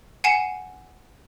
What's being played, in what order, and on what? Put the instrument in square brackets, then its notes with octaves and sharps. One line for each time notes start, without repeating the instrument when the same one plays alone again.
[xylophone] F#5 G#5 C7 C#7 E7